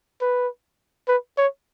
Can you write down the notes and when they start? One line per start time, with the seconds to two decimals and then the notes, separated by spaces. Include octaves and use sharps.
0.21 B4
1.08 B4
1.38 C#5